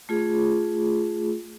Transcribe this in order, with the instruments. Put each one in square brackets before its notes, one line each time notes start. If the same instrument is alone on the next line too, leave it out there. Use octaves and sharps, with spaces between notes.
[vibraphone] A3 F4 G#4